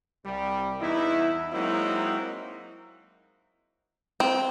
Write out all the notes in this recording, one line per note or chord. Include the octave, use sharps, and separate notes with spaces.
C2 G3
E2 D#4 E4
F#3 G#3 A#3 C4 D#4 E4
C4